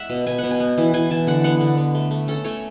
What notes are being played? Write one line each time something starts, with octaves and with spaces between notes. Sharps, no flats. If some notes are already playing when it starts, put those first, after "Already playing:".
Already playing: G#3 E5 F#5
B2
B2 G#5
B2 F#5
G#5
B3
E3
E3 G#5
E3 A5
D3 F#5
B3 F#5
D3
B3
A3
A3
C#4 A4
A3 C#5